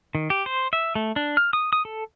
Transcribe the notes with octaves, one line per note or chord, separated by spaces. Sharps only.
D#3
G4
C5
E5
A3
D4
F6
D#6
D#6
A4